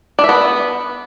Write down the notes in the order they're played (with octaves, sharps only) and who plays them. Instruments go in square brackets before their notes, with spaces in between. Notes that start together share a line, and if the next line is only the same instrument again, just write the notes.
[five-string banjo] D4
E5
B3